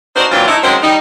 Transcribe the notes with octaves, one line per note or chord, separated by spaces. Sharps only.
D4 D#4 F#4 A#4 C5
A#2 E3 F#3 C4 D4 F4
A3 D#4 E4
D#3 F#3 G#3 C4 C#4 C5
G3 D#4